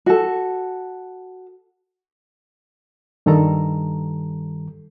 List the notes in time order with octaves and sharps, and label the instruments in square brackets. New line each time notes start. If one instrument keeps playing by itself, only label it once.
[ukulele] F#4 A4
[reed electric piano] G2 D#3 G3 A4 A#5